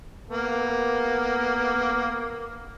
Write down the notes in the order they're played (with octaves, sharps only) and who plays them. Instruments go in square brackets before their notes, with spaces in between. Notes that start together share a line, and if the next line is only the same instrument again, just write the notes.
[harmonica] A#3 B3